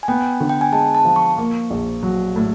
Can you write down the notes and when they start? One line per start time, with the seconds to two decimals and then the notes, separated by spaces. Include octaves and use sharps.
0.03 G#5
0.08 B3 G5
0.40 D3
0.49 G5
0.61 G#5
0.72 G#3 A5
0.95 A5
1.05 F3
1.16 C#6
1.38 A#3
1.70 A#1
2.03 F#3
2.36 A2